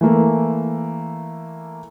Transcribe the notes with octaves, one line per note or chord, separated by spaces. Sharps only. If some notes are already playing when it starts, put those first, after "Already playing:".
E3 A3 A#3